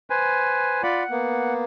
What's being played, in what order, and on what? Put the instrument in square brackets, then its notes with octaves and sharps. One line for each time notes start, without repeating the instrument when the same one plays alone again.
[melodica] B4 C5 G#5
[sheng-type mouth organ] F4 D5 B5 [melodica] F#5
[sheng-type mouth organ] A#3 B3